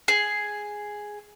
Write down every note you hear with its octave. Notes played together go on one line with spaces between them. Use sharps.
G#4